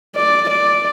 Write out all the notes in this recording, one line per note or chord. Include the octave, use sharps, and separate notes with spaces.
D5
D5